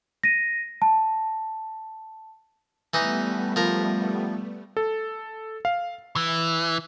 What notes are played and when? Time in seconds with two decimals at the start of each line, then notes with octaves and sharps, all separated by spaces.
0.23 A#6 D#7
0.82 A5
2.94 E3 G3 A3 B3 D#4
3.56 F3 A#4
4.77 A4
5.65 F5
6.16 E3